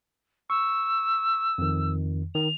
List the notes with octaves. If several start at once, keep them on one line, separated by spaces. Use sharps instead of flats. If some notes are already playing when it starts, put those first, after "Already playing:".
C#6 E6
F2 D#3
D#3 F7